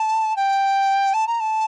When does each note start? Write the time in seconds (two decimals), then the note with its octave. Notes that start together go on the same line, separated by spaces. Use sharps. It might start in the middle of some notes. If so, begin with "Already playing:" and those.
Already playing: A5
0.36 G5
1.14 A5
1.27 A#5
1.40 A5